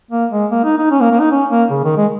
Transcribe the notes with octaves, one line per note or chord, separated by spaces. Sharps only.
A#3
G#3
A#3
D#4
D#4
C#4
A#3
A#3
D#4
C#4
A#3
C#3
D#3
G#3